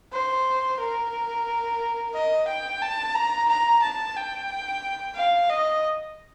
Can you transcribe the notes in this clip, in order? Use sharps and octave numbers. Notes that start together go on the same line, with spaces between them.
C5
A#4
D#5
G5
A5
A#5
A#5
A5
G5
F5
D#5